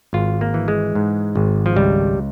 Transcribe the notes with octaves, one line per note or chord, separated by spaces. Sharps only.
G#1 F4
A#3
E3
G#3
G#2
G#1
F3
C#2 G3